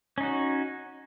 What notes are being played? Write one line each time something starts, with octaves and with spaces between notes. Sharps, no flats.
C#4 D#4 F#4